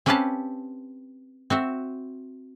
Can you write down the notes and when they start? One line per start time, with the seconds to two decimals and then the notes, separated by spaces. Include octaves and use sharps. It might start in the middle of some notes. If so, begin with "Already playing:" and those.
0.06 C4 C#4 G4 B4 F5 A5
1.50 C4 F#4 E5